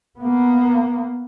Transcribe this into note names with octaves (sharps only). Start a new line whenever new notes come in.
A#3 B3